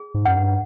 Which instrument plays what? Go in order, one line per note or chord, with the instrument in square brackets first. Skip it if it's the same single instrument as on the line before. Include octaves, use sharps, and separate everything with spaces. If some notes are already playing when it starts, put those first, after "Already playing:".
Already playing: [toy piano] G#4
[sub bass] G#2
[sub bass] F#2 [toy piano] F#5
[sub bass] G2